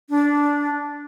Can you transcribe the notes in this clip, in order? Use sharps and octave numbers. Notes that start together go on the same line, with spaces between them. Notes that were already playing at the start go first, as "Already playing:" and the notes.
D4